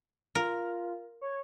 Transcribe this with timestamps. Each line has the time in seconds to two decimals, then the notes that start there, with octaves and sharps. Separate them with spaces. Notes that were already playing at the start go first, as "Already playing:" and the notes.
0.35 F4 A#4
1.21 C#5